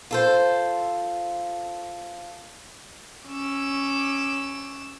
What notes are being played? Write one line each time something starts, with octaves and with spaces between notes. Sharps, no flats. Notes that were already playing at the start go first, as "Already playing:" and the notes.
F4 A4 C5
C#4 D6 E6